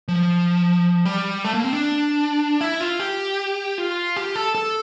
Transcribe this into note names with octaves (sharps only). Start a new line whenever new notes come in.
F3
G3
A3
A#3
C4
D4
E4
F4
G4
F4
G4
A4
A4